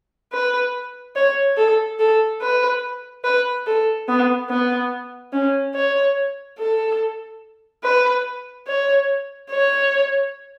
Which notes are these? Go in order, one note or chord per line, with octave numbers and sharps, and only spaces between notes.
B4
C#5
A4
A4
B4
B4
A4
B3
B3
C#4
C#5
A4
B4
C#5
C#5